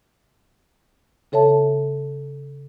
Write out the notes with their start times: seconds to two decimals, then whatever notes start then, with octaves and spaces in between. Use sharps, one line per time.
1.32 C#3 A4 C#5 E5 A5